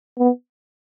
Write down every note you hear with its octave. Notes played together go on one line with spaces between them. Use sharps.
B3